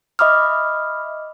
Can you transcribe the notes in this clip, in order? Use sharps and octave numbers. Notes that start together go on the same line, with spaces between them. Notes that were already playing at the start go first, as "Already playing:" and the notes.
D#5 E5 B5 D6 D#6 F6